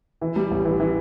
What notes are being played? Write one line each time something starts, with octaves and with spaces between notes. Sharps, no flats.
E3
G3
A1
E3
E3